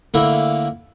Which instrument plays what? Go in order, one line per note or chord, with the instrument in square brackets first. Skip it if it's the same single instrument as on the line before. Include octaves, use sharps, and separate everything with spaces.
[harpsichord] D3 A3 A#3 E4